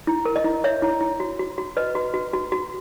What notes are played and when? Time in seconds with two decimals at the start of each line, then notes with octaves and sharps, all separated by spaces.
0.07 E4
0.25 A#4
0.36 D#5
0.44 E4
0.64 C#5 E5
0.82 E4
1.01 E4
1.20 F#4
1.39 F#4
1.58 F#4
1.77 B4 D#5
1.95 F#4
2.14 F#4
2.33 F#4
2.52 F#4